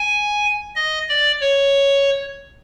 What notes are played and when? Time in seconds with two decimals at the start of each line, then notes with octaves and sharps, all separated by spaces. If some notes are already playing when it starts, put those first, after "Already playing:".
Already playing: G#5
0.75 D#5
1.09 D5
1.41 C#5